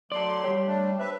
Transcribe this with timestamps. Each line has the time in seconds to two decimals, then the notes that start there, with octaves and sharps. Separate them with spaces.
0.12 F#3 A3 A4 D5 C6
0.44 G3 G4 C#5
0.67 A3 D4
0.99 B4 C5 E5 B5